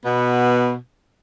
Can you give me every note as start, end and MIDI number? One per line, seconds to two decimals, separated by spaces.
0.05 0.75 47
0.05 0.75 59